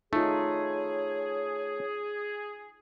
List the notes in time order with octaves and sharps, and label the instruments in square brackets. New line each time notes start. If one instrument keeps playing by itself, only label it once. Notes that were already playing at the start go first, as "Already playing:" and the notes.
[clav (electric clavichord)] A3 [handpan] D#4 F4 [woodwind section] G#4 [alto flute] C#5